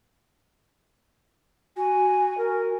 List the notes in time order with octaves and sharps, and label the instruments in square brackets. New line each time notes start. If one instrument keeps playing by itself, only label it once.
[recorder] F#4 [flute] G#5
[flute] A#4